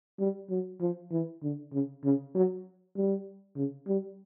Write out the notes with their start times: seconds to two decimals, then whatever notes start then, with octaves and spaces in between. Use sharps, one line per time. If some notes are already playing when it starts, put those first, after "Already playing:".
0.19 G3
0.50 F#3
0.81 F3
1.12 E3
1.43 D3
1.73 C#3
2.04 C#3
2.35 F#3
2.96 G3
3.57 C#3
3.87 G3